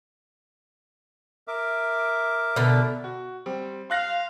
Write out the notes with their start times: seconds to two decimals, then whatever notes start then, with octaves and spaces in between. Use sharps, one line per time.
1.48 A#4 E5 D6
2.56 B2 D3
3.04 F#4
3.46 G3 C4
3.90 F5 C6 F#6 A#6